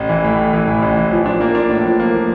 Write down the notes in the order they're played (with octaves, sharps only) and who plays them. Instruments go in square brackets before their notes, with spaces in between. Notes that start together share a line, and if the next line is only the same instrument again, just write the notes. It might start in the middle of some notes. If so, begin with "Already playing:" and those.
Already playing: [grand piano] A1
E3
A2
A2
E3
A2
A1
E3
F3
D4
A#3
D4
A2
F3
A#3
F3